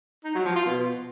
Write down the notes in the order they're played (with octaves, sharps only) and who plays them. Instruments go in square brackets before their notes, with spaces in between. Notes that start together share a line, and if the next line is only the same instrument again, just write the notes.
[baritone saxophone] D#4
F#3
F3
F4
B2